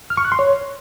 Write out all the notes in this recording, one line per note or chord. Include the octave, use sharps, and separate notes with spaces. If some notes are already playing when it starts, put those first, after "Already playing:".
F6
C#6
F#6
C6
C#5